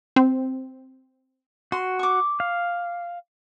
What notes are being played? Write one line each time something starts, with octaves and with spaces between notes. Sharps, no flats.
C4
F#4 C6
C#6 D6
F5